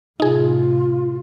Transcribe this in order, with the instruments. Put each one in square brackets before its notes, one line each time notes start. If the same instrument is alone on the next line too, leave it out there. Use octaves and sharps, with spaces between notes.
[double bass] A2 C3 [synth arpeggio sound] D#4 G#4 [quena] F4